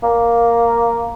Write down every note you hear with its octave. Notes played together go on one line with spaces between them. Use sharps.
A#3